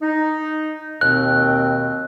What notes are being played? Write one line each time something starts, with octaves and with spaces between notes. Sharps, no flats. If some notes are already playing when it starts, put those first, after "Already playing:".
D#4
D#2 B2 C4 F#6